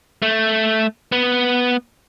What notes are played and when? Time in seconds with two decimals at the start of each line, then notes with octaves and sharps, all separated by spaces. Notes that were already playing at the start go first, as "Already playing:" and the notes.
0.22 A3
1.12 B3